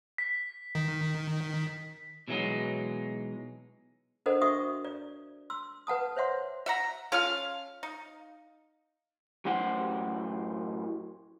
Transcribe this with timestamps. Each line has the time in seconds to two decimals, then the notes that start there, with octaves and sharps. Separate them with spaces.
0.18 B6
0.75 D#3
2.28 B2 E3 F#3 G#3 D#4
4.26 D4 A4 A#4 C5 D#5 F#5
4.41 F#4 E5 C#6 D#6
4.85 D5
5.50 C6 E6
5.87 B4 F#5 A5 D#6
6.16 C5 C#5 E5 F#5 C6
6.66 E5 F#5 A#5
7.12 C#4 F4 A4 F5 F6
7.83 D#4
9.45 F#2 A2 G4 C5 F#5